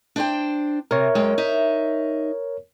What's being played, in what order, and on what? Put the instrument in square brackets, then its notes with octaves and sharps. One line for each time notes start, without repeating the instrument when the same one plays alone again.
[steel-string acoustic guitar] D4 C5 G5
[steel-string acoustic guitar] C3 [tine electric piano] A#4 C#5
[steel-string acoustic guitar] F#2 G#3 G5
D#4 E5